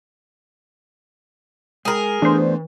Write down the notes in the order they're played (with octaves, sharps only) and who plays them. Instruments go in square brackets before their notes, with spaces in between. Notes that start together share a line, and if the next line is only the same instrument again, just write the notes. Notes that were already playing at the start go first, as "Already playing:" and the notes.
[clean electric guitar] G#3 [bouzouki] G#4 A#4
[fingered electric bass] E3 [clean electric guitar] A3 B3 [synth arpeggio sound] D4 C5